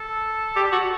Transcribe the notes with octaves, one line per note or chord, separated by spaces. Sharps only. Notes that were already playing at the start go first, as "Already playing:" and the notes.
Already playing: A4
G4
F#4